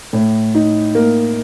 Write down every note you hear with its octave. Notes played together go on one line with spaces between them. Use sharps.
A2
D#4
A#3